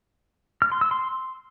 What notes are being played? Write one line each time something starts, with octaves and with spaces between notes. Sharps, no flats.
F6
C6
E6
C6